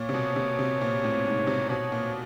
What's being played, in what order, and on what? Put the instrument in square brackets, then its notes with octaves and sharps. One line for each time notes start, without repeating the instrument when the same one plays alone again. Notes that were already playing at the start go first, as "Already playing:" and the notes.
Already playing: [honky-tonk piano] A#2 [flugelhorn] C#5
[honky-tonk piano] C3
B2
C3
C3
A#2
A2
G#2
C3
[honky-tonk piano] B2 [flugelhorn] C#5
[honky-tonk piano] A#2